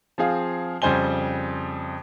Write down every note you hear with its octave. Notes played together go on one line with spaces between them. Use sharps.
F3 C4 G#4 F5
F2 C#3 G3 C5 G#5 G7